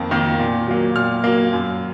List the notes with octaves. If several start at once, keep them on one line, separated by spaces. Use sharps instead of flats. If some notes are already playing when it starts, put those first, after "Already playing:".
Already playing: F2 D#3 A#3
D#3 A#3
A#2
F#3 A#3
A#2 F6
F#3 A#3
F#2